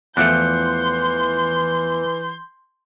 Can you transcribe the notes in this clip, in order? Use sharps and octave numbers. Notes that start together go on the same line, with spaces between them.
E2 E3 F3 A3 C6 F#6 G6 C#7